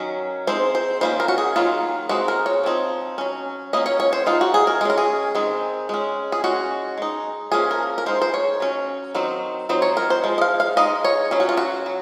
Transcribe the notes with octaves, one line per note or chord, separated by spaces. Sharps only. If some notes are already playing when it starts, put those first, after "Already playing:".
Already playing: D#3 F#3 C#4
G#3 C4 D#4 C5
C5
D#3 A#3 C#4 C5
A#4
F#4
G#4
D#3 F#3 A#3 F4
G#3 C4 D#4 F#4
A#4
C#5
F3 C4 D#4
F#3 C#4
F#3 A#3 C#4 D#5
C#5
C#5
C5
G#3 D#4 F4
F#4
G#4
A#4
G#3 C#4 G#4 A#4
G#4
D#3 G#3 C4
G#3 C#4
G#4
G#3 C#4 F#4
G#3 D#4
F3 A#3 C#4 G#4
A#4
A#4
G#3 D#4 C5
C5
C#5
F#3 C#4
D#3 F#3 C4 D#4
F#3 C4 D#4 C5
C#5
A#4
C5
F3 G#3
D#5
F5
F5
G#3 D#4 D#5
C#5
F#3 C#4 G#4
F#4
F4
F#4
F#3